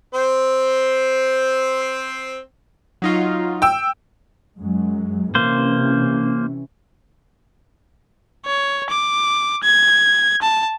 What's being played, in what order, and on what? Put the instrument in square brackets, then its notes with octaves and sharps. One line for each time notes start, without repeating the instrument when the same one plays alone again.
[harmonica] C4 C5
[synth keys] F#3 D#4 F4
[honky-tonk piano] G5 E6
[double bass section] F#2 F#3 G#3
[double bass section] C3 E3 C#4 [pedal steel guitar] A#3 C5
[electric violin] C#5
D6
G#6
A5